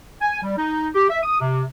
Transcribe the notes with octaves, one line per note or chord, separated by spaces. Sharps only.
G#5
G3
D#4
G4
E5
D#6
C3